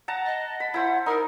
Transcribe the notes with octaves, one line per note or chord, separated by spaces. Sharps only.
F#5 A5 A#5
D#5
B5
E4 C5 F#5
D#4 A#4